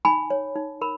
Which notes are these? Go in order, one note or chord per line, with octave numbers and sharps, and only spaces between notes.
D#4 G#5 B5
C#5
D#4
A#4 B5